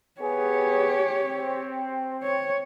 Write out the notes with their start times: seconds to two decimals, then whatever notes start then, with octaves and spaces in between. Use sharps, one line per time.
0.21 B3 G4 G#4 C#5
1.24 C4
2.23 C#5